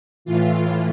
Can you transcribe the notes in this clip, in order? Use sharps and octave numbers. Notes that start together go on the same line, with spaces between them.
A2 E3 F4